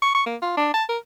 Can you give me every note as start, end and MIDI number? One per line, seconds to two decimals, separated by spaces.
0.02 0.13 85
0.15 0.24 85
0.26 0.36 58
0.42 0.56 65
0.57 0.70 62
0.74 0.84 81
0.89 0.98 70